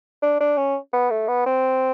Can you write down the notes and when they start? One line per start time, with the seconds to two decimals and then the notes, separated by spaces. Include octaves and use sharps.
0.22 D4
0.40 D4
0.58 C#4
0.93 B3
1.10 A3
1.28 B3
1.46 C4